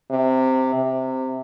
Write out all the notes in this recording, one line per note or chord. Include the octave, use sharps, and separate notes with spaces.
C3
C3